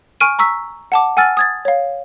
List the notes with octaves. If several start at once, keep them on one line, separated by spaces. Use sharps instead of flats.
G#5 C#6 F6 D7 D#7
A#5 C#6 E6 B6
F#5 A5 D6
F#5 G#5 E6 F6 A6
D#6 G#6 A6
C#5 F5